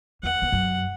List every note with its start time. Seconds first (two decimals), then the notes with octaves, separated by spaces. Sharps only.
0.23 E2 F#5
0.42 E2
0.52 F#2